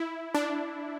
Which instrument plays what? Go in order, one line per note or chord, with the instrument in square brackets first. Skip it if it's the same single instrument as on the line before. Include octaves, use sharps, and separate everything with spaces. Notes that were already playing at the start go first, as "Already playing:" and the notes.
Already playing: [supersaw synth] E4
D4